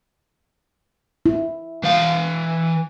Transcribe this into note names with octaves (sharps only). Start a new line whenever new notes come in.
E4
E3 F5